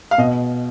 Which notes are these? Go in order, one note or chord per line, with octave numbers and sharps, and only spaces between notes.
F5
B2 D#5